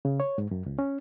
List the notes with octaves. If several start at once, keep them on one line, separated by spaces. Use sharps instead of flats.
C#3
C#5
G#2
F#2
C#2
C#4